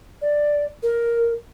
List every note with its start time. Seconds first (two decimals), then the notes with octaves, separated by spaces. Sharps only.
0.21 D5
0.83 A#4